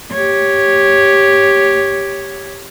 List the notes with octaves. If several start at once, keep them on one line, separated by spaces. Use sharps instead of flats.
G4 C#5